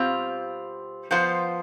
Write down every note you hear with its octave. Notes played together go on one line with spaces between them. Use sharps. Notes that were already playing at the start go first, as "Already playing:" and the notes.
Already playing: B2 G3 C4 F4
F3 B3 F4 C5